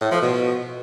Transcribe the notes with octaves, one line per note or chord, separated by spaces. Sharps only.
A2
F3
B2